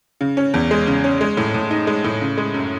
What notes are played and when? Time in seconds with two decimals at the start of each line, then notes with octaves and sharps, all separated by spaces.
0.21 C#3
0.37 C#4
0.54 E2
0.71 G#3
0.87 C#3
1.04 C#4
1.21 G#3
1.37 A2
1.54 A2
1.71 D#4
1.87 G#3
2.04 A2
2.21 C#3
2.37 G#3
2.54 F#2